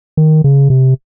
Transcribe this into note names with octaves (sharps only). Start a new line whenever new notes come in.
D#3
C#3
C3